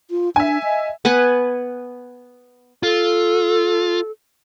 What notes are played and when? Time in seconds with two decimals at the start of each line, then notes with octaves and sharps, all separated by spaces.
0.11 F4
0.36 D4 E5 G#5
0.63 D#5
1.05 B3 B4 F#5 G#5
2.83 F4 A4